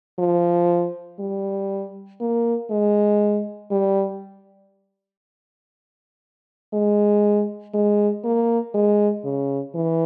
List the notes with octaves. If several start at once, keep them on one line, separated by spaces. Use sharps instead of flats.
F3
G3
A#3
G#3
G3
G#3
G#3
A#3
G#3
C#3
E3